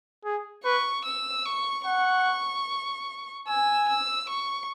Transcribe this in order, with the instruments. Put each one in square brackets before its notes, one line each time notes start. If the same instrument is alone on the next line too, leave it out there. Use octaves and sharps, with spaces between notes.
[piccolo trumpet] G#4
[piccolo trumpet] B4 [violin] C#6
[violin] E6
C#6
[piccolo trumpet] F#5 [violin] C#6
[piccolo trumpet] G#5 [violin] E6
[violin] E6
C#6